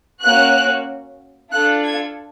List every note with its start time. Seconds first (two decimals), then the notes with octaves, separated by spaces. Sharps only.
0.21 A#3 C#4 F#4 F#6
1.51 D4 F4 A4 F#6
1.84 G#6